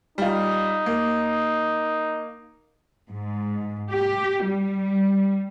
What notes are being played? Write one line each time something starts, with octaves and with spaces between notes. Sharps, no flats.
G3 D#4 F4
A#3
G#2
G4
G3